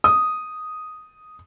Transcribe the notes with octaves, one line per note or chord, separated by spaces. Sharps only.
D#6